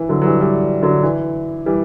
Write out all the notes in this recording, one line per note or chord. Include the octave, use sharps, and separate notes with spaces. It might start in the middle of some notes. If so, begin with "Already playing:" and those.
Already playing: E3
D3 F#3
F#3
E3 G3
E3 G3
D3 F#3
E3
E3 G3